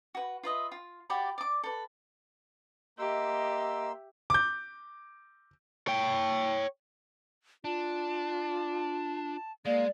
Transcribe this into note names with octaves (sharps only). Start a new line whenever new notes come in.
F#4 B4
F4 B4 D#5 E5
F4
F#4 G4 D5 B5
D5 D6
A4 B4
A#3 G4 D#5 E5 C6 E6
D6 G6
C#5 G5
D4 F4 A5
G#3 A#3 D5 F5